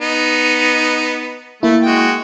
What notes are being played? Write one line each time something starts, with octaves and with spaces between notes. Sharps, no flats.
B3 D#4
A3 A#3 E4
G#3 F#4 G5